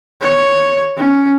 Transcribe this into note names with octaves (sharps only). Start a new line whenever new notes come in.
C#5
C#4